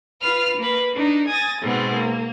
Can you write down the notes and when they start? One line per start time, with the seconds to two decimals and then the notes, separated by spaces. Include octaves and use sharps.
0.21 F4 B4 F6
0.57 A#3 B4
0.93 D4 D#4
1.28 G#5 D#6 A6 A#6
1.62 G#2 B2 B3 C4
1.95 A#3